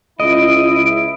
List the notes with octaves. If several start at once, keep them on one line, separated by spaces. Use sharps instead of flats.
C#2 E4 D#5 D#6 D7